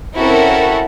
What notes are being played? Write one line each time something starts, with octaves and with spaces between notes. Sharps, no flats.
C4 C#4 E4 F#4 A4 A#4